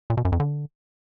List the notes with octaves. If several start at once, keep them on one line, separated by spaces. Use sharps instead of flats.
A#2
B2
F#2
F2
D3